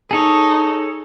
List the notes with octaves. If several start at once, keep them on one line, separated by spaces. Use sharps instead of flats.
D#4 G#4 A4 C#5